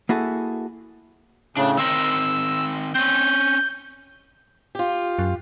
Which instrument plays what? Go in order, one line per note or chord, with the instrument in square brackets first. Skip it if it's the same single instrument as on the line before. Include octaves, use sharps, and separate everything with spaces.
[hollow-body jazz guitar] A#3 E4 F#4 G#4 A4
[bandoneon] A2 C#3 [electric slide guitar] D4
[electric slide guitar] D#3 C4 A#4 [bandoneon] E6
[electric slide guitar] C4 C#4 [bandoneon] G6
[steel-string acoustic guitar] F4 G4
[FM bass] F#2